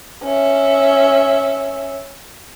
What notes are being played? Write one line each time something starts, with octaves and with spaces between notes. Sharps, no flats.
C#4 E5